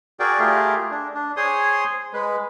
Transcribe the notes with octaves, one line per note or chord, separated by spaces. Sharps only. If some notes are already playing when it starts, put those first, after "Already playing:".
F#4 G#4 A#4 D5 G5
A3 F4 G4 G#4 A#4
D4
D4
G#4 C5 C#5 C6 D#6
G#3 B4